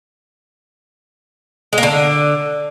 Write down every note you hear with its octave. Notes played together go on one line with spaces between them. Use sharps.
G#3
A#3
D3